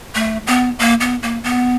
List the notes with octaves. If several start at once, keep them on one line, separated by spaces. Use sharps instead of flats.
A3
B3
A#3
B3
A#3
B3